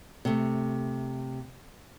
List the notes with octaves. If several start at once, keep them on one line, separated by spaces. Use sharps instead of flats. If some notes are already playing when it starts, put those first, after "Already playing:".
C3 A3